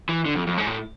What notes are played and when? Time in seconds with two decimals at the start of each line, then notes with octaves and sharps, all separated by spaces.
0.09 E3
0.26 D3
0.35 F2
0.47 F2
0.58 G#2
0.67 A2